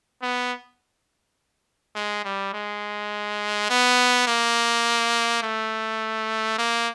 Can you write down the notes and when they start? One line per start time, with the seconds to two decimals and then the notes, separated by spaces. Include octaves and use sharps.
0.23 B3
1.95 G#3
2.25 G3
2.53 G#3
3.70 B3
4.27 A#3
5.43 A3
6.58 A#3